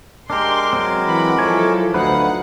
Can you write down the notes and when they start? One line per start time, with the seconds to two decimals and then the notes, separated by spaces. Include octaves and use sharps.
0.30 G#3 D4 G4 A#4 C6 D6
0.73 F#3 C4
1.07 E3 F#5 B5
1.39 F3 F#3 E4 A4 C#5 G#5
1.94 D2 D#4 B4 F5 F#5